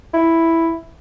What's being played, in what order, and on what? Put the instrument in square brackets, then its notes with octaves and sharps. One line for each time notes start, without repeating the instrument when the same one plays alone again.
[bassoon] E4